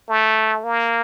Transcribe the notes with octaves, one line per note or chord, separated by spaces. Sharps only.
A3
A#3